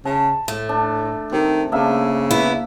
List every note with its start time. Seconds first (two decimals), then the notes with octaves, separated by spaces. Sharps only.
0.05 C#3 A5
0.48 A2 A3
0.69 D4
1.32 C3 D#3
1.72 C#3 A#3 D4 E5
2.31 B3 E4